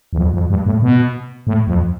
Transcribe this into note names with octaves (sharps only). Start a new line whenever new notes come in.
E2
F2
F2
G2
A2
B2
A2
F2